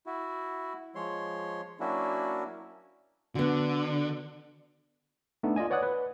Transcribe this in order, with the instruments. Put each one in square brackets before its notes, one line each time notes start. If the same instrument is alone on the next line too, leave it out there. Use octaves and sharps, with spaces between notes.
[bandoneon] E4 F#4
F3 G#3 C#5 C6
F#3 A#3 C#4 D4 E4 F#4
[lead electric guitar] D3 [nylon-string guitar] B3 F#4
[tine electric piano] A3 B3 D4 D#4
F4 D5 D#5 G#5
B4 C#5 D5 F#5 D#6 F#6
B4